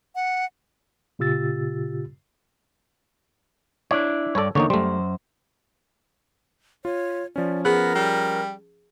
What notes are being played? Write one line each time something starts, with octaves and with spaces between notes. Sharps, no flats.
F#5
A#2 C#3 F4 G4 E6 A6
D4 E4 C#5 D5
G2 A4 B4 C#5 D5
E2 D3 E3 A#3 D#4 C#5
F#2 G3 A3 C5
F4 C#5
F3 C#4 D5
B3 G#4 A#4
G3